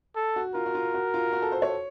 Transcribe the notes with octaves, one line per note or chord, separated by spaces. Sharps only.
A4
F#4
F4 A#4
F#4
F4
F#4
F4
F#4
A4
C5
C#5